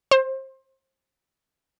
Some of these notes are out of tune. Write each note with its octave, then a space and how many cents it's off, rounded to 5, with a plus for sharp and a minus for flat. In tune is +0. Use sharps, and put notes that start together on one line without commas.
C5 +25